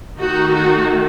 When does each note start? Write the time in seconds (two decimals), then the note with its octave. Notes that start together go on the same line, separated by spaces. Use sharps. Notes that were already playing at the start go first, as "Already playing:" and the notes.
0.19 D#3 A3 D#4 F#4
0.52 F#4